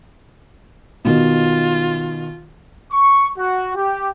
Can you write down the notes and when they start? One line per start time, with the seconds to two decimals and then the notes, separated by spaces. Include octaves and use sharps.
1.05 B2 D#3 F4
2.92 C#6
3.38 F#4
3.75 G4